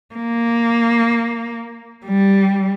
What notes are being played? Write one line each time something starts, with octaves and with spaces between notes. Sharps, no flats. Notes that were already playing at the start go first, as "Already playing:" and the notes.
A#3
G3